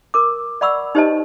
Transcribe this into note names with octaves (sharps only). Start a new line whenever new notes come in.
A#4 D6
D5 F#5 B5 C#6 E6
D#4 G4 C5 C#5 D#5 A5